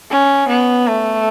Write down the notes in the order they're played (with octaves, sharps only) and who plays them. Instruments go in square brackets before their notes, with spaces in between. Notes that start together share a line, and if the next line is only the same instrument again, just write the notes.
[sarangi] C#4
B3
A3